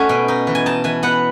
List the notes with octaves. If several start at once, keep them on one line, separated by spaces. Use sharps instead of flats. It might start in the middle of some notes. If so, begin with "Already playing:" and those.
Already playing: A3 C#4 D#4 F#4 E5 G#5
B2
D#4
E3
G#5
D#4 A5
E3 G#5
B3 F#5